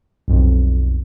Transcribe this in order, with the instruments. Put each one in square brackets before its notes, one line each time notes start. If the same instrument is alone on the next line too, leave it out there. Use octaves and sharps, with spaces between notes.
[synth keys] B1 F2